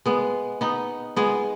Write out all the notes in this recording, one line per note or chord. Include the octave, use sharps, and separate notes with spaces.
G#3 B3
B3 D#4
G#3 B3